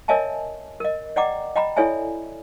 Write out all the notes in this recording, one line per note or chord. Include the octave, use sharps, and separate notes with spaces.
A#4 C#5 D#5 E5 G#5 A5
A#4 D#5
D5 D#5 F#5 G5 A#5 D6
D#5 G5 A#5 B5
E4 A4 C#5 D5 E5 G#5